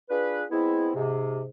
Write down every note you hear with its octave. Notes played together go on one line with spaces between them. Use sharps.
D4 F4 G#4 B4
G#3 B3 C4 E4
G#2 C3